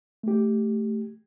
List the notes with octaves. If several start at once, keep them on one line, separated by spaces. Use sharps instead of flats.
A3 G4